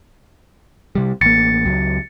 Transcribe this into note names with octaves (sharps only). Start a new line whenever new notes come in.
C3 G3
A1 A#3 A6 C#7
C#2 F#3